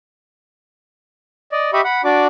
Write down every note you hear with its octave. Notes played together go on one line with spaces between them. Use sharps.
D5 D#5
G4 D#5 E5 B5 C#6
F#5 B5
D4 F#4 D5 D6